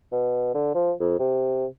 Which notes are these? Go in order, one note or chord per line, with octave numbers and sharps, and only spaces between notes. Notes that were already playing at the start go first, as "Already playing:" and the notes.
B2
D3
F3
F2
C3